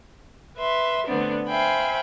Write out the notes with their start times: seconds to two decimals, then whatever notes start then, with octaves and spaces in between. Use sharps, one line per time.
0.57 B4 E5 C6
1.07 D3 A3 B3 C4 D4
1.48 C5 E5 F5 G5 G#5 B5